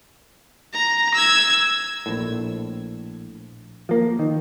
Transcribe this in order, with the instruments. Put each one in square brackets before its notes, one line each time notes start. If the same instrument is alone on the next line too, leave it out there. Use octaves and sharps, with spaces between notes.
[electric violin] A#5
E6 G#6
[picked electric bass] A#1 A2
F3 A#3
D#3